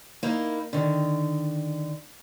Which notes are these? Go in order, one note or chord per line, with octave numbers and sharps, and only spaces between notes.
A#3 D#4 E4
D3 D#3